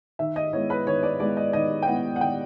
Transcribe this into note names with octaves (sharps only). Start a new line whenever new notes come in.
D#3 E5
D#5
G#3 B3 E4 C#5
B4
D#3 C#5
D5
G#3 B3 E4 D5
D#5
D#3 D#5
G5
G#3 B3 E4 F#5
F#5
D#3 G5